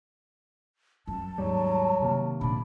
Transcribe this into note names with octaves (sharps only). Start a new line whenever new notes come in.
F#2 A5
D#2 G#2 F#3 G3
C3 D#3 A#3
A#2 F3 D4 B5